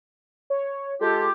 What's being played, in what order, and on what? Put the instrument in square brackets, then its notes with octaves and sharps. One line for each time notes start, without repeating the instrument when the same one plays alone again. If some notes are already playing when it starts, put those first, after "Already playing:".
[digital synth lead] C#5
[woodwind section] G#3 F4 G4 [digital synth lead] A4